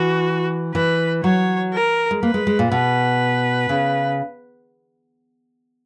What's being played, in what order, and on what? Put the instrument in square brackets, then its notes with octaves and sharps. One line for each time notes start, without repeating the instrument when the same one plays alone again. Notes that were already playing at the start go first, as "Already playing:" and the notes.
Already playing: [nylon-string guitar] E3 [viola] F#4
[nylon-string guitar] E3 [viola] B4
[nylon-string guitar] F#3 [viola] C#5
[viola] A#4
[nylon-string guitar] G#3
[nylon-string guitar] A#3 [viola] B4
[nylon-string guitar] G#3
G#3
A#2
[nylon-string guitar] B2 [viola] B4
[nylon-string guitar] C#3